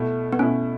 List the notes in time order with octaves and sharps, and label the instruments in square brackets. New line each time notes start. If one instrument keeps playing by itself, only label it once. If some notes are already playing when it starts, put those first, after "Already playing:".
Already playing: [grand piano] B2 A3 E4
[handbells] B3
[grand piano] B2 A3 E4 [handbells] C#4